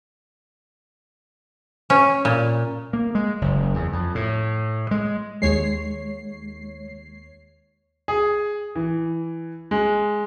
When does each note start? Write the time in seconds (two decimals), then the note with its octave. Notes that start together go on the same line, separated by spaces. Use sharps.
1.90 C#4
2.25 A#2
2.93 A#3
3.15 G#3
3.41 F#1
3.74 E2
3.93 F2
4.15 A2
4.91 G#3
5.42 D#2 G#3 C#5 C7
8.08 G#4
8.75 E3
9.71 G#3